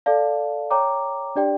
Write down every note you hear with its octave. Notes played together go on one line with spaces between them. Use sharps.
A4 D5 F5 A5
C#5 G5 A#5 D6
D4 G4 D5 G5